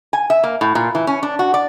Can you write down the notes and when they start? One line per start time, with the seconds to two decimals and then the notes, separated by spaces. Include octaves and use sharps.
0.13 G#5
0.30 E5
0.44 A#3
0.61 A2
0.75 A#2
0.95 E3
1.07 C#4
1.23 D4
1.39 F#4
1.54 D5